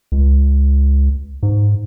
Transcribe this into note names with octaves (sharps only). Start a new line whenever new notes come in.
C#2
G#2